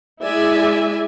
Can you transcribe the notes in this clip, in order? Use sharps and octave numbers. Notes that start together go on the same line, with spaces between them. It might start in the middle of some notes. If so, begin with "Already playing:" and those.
G#3 E4 D5 E5 G#5